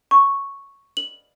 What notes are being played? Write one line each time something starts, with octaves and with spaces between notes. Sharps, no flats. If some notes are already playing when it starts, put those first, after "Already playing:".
C#6
F#7